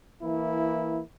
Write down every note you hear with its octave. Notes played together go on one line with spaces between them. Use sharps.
E3 A#3 E4